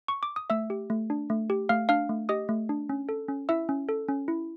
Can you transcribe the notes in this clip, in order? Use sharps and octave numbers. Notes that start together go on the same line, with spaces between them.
C#6
D6
D#6
A3 E5 E6
G4
A3
D4
A3
G4
A3 F5 F6
D4 F5 F6
A3
G4 D#5 D#6
A3
D4
C#4
A4
C#4
E4 E5 E6
C#4
A4
C#4
E4